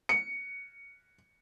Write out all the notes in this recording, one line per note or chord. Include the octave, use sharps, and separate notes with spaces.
C#7